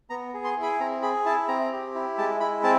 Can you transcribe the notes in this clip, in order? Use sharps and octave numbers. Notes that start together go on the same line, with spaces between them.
B3 A#5
G#4
C6
E4
B5
C4 A#5
G#4 B5
E4 A5
C4 A#5
G4
E4
G#3 A5
E4 B5
C4 A5